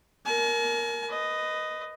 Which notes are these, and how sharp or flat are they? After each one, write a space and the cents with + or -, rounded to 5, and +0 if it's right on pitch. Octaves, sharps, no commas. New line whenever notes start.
A#4 +0 G#5 +45
B4 +25 D#5 +0